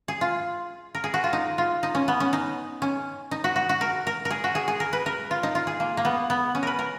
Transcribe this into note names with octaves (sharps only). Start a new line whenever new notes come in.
G#4
F4
A#4
G#4
F#4
F4
D#4
F4
D#4
C#4
B3
C#4
D#4
C#4
D#4
F#4
F#4
F#4
A#4
A#4
A#4
G#4
F#4
G#4
G#4
A#4
B4
A#4
F4
D#4
F4
G#4
A#3
A#3
B3
B3
C#4
A#4 B4
A#4